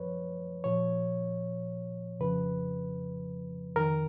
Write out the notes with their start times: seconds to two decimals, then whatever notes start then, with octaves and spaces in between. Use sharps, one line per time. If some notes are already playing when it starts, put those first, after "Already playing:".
Already playing: F#2 F3 B4 C#5
0.64 A#2 F3 C#5
2.20 F2 C#3 F3 B4
3.76 F2 D#3 A#4